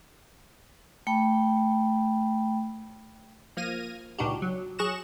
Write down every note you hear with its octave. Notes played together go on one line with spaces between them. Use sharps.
A3 G5 B5
F3 A#3 F6 G#6 A#6 D#7
C#2 A#2 D4 D#4 F#4 G4
F#3
F#3 G#4 C#6 F#6 A#6 E7